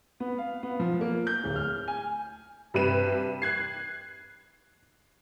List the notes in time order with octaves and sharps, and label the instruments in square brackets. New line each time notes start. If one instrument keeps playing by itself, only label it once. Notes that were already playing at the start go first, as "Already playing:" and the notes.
[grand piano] B3
F5
B3
F3
A#3
G6
D1
F6
G#5
[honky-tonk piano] G2 C3 B4 D#7 E7
F#6 G#6 C7